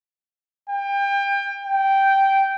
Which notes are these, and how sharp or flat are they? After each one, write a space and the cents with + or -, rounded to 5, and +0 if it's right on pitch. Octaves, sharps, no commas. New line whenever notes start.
G5 +30
G5 -10